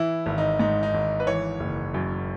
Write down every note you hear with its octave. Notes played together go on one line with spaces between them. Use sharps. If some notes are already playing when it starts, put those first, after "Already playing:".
Already playing: E3 E4
G#1
D#4
G#2 D#4
D#4
G#1
B4
E3 C#5
F#1
F#2